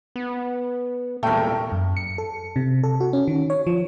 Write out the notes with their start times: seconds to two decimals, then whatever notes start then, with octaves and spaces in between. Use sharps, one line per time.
0.16 B3
1.23 E1 C2 A#2 A3 A#4 G5
1.72 F#2
1.97 C#7
2.18 A4
2.56 C3
2.83 A4
3.00 F#4
3.13 C#4
3.27 D#3
3.50 C#5
3.67 F3